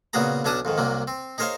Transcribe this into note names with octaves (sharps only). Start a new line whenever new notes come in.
A#2 C#3 B3 F#4 G#4 A#5
B1 F#3 C#4 D4 A5 D#6
F2 G#2 D#3
C2 C3 F#3 A#3
C4
D#4 G#4 A#4 C5 C#5 F5